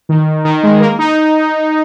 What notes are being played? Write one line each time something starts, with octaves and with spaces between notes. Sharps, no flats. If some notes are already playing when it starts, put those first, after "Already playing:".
D#3
D#3
G#3
A#3
D#4